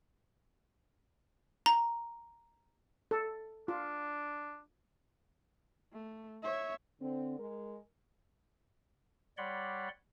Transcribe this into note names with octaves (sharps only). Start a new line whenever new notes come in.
A#5
A4
D4 F4
A3
C#5 E5
D3 C4
G#3 A#4
G3 C#5 D5 F#5 B5 C6